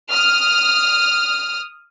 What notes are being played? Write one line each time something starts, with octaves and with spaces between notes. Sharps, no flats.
D#6 F6